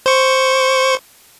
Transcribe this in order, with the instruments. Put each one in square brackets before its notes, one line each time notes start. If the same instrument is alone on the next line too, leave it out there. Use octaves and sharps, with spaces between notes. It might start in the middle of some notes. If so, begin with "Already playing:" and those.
[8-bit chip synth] C5 C#6